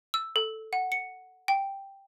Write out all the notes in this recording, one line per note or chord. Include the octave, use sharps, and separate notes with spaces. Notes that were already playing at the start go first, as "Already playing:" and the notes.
E6
A4
F#5
C#7
G5